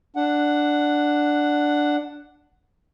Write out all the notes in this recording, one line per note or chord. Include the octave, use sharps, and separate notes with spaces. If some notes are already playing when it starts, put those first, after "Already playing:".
D4 F#5